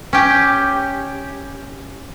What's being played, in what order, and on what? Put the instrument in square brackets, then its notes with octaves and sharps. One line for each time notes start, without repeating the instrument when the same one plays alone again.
[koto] C#4 G4